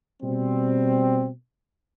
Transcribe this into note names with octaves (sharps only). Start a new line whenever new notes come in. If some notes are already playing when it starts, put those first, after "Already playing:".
B2 G3 C4